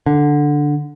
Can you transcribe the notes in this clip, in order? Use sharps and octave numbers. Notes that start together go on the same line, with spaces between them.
D3